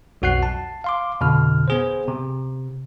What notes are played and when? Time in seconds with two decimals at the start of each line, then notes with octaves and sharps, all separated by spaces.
0.22 B1 F2 F#4 F#5 F#6 C7
0.43 A5
0.84 F5 C6 D6
1.21 F2 B2 D3 F6
1.68 B3 G#4 C5
2.08 C3